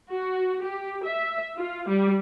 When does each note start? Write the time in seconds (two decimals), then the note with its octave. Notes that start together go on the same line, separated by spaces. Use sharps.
0.11 F#4
0.65 G4
1.05 E5
1.56 F4
1.88 G3